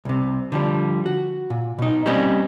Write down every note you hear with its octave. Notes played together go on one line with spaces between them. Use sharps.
C2 C3
D3 F3 G3
F#4
A#2
B2 D#4
G3 A#3 C4 C#4 C5 D#5